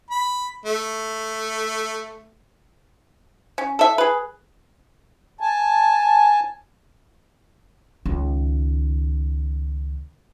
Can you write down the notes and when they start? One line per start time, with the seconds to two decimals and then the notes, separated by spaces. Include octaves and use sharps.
0.11 B5
0.66 A3
3.58 C#4
3.79 A4 E5
3.98 G#4 B4
5.41 G#5 A5
8.06 C#2 D#3